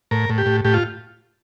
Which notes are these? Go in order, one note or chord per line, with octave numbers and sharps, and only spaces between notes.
A2 A#4
A2
G4
A2
A2 G4
F4